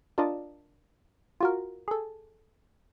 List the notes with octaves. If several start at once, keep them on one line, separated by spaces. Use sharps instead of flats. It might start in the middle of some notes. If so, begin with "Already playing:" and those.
D4 F4 A#4 D5 D#5 A5
F4 F#4 A#4
G#4 A4